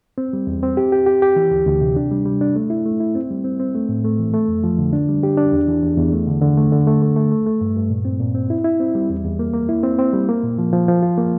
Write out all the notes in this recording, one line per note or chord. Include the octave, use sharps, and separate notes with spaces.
C4
G3
E2
C4
G4
G4
G4
G4
E3
D2
D2
C3
D4
G3
G3
D4
A3
E4
A3
E4
C4
G3
C4
C4
A3
A2
A3
E3
A3
F2
F3
D3
D4
G3
G4
D4
E2
E3
E2
E2
A3
D3
D3
A3
D3
A3
A3
A3
A3
A3
G2
G2
A#2
C4
A#2
C4
E4
E4
C4
G3
E2
E2
A#3
A#3
E4
C4
C4
G3
A#3
A#2
F3
F3
F3
F4
A#3